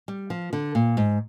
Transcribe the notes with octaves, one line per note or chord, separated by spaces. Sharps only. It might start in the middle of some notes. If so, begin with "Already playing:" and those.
G3
F3
D3
A#2
G#2